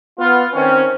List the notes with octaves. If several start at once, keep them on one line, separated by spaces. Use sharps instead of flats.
B3 F4
D#3 C4 C#4